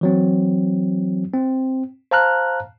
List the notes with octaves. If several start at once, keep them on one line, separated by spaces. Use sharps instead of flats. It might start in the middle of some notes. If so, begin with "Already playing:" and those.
E3 F#3 C4
C4
C5 F5 A5 A#5 F6 F#6